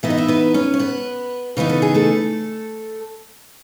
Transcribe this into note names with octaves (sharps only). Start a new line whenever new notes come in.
E3 B3 D#4 E5
D#5
E4 E5
B3 B4
C#4 C#5
C#5
B3 B4
C#3 E3 B3 D#4 B4
A4
G#4
A3 A4